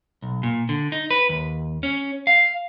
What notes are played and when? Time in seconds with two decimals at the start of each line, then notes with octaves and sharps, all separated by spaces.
0.22 B1
0.43 A#2
0.69 D3
0.92 D#4
1.10 B4
1.29 D#2
1.83 C#4
2.27 F5